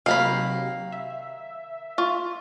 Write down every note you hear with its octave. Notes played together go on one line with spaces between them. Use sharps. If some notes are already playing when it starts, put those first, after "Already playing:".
C3 D#3 F#3 A#3 F5 B5
E5
F4 C#6